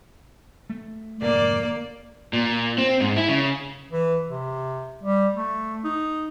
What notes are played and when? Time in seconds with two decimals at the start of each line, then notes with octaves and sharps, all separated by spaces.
0.70 A3
1.22 F1 G#2 D3 A#3 D5
2.33 A#2
2.78 C4
3.00 G#2
3.16 E4
3.28 C#3
3.91 E3
4.27 C3
5.03 G3
5.34 A3
5.84 D#4